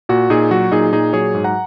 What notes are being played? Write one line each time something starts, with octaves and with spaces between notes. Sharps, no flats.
A#2 F#4
A#2 D#4 G#4
F#3 F#4
A#2 D#4 G#4
A#2 D#4 G#4
F#3 G#4 C#5
G#2
F#5 A#5